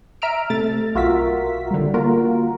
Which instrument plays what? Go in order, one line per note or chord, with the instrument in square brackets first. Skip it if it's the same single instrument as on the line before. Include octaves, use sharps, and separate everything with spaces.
[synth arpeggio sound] E5 A#5 E6 F6 D7
C3 A3 A6
B1 F4 F#4 A#4 E5 B6
D3 G3
A#3 F4 F#4 A#4